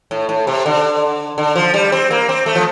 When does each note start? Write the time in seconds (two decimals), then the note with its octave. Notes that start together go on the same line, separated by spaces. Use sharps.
0.11 A2
0.29 A2
0.47 C3
0.66 D3
1.38 D3
1.56 F3
1.74 G3
1.92 C4
2.11 A#3
2.29 C4
2.46 A3
2.55 F3